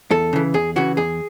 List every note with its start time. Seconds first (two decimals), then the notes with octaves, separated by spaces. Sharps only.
0.11 E2 A4
0.33 C#3 E3
0.54 E2 G#4
0.76 C#3 E3 F#4
0.97 E2 G#4